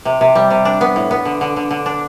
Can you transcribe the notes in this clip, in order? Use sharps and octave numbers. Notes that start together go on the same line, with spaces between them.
C3
C3
G3
C3
D4
B3
A2
B3
D3
D3
D3
D3
D4